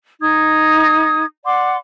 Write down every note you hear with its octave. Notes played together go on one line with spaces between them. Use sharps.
D#4 D#6 G#6
D5 F#5 C6 D6